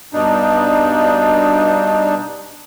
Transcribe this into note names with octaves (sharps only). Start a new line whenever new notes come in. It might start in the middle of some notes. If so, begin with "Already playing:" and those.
G2 B2 D4 D#4